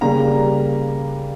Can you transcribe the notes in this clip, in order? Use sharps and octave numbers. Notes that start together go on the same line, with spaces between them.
C#3 G3 A#3 C#4 A#5